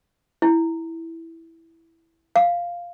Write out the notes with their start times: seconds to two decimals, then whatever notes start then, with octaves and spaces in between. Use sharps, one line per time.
0.42 E4
2.36 F5